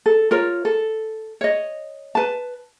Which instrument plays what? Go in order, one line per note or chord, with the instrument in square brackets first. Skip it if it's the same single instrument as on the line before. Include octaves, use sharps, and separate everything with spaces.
[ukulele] A4
F4 A#4 C#5
A4
C#5 D#5
B4 A5